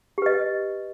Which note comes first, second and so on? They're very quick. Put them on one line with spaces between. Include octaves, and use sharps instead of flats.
G4 B4 D#5